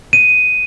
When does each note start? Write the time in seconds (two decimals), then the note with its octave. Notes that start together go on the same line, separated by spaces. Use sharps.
0.13 D#7